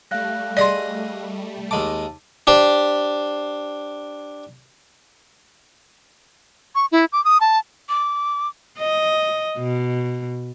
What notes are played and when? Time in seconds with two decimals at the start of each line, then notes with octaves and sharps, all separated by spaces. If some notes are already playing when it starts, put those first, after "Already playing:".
0.11 G3 A3 F5 F#6 A#6
0.57 G#4 D5 D#5 C6
1.71 D#2 G#3 A5 D6
2.47 D4 G4 C5
6.75 C#6
6.92 E4
7.13 D6
7.25 D#6
7.41 A5
7.89 D6
8.78 D#5
9.58 B2